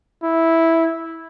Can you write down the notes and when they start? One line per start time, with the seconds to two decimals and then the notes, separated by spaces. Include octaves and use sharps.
0.23 E4